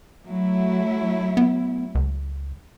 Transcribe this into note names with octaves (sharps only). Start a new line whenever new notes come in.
F#3 A3 E4
B3
C#2